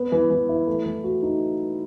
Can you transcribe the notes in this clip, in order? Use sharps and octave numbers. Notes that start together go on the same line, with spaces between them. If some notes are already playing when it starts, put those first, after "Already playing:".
Already playing: B3
E3
E3
E4
A3
E3
F#4
D#4